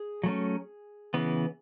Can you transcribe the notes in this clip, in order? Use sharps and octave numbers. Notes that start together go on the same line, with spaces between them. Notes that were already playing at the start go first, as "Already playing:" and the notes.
Already playing: G#4
F#3 A3 C#4
C#3 E3 B3